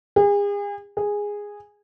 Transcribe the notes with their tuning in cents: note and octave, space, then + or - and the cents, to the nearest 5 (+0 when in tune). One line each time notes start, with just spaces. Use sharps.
G#4 -40
G#4 -10